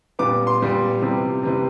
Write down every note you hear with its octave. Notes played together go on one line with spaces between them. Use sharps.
A#2 G3 B3 D6
C6
A#2 G3 B3
C3 E3 G3 C4
C3 E3 G3 C4